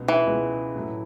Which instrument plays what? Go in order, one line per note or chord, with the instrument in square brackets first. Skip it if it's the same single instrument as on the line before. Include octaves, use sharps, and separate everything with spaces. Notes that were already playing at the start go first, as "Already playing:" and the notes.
Already playing: [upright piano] C#2 B2 G#3 B3
[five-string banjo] E3
[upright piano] C#2 B2 G#3 B3
A2 F#3 A3